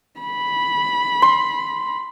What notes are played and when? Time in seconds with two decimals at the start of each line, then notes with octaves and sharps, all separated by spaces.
0.21 B5
1.22 C6